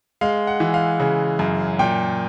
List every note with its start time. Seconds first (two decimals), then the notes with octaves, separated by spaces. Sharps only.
0.21 G#3 F5
0.47 F#5
0.60 E3
0.74 F5
1.00 C#3
1.39 F#2
1.79 A#2 G5